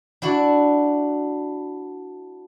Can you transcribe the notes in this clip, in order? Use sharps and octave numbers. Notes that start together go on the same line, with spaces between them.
D4 E4 F#4 D5